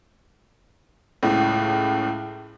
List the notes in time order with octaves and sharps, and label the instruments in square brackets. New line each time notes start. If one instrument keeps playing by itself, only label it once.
[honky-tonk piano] C#2 A2